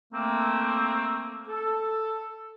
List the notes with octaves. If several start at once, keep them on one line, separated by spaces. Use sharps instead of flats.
A3 A#3 C4
A4